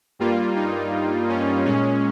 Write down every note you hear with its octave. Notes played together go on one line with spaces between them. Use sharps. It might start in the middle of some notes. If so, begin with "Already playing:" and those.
G2 G3 A#3 F4
D#4
C#4
A#2 G#3 C#4